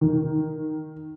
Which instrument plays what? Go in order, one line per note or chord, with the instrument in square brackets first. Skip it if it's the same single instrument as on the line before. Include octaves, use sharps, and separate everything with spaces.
[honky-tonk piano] D#3